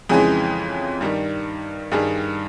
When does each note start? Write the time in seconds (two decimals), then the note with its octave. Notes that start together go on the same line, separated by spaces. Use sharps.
0.09 F2 C#3 E3 G#3 G#4
1.01 G2 D#3 G3
1.92 G2 D#3 G3 G#4